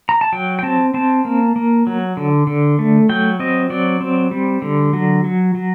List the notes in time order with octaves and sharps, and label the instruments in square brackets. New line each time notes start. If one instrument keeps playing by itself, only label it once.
[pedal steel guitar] A#5
A5
F#3 G5
G5
C4 A5
C4 A5
A#3
A#3
F#3
D3
D3
A3
F#3 G5
C4 D#5
F#3 D5
C4
G3
D3
F#3
F#3
F#3